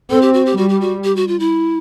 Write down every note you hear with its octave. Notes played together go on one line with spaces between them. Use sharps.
C4 A4
G4
F#4
G4
G3 F#4
G4
F#4
G4
F#4
F4
E4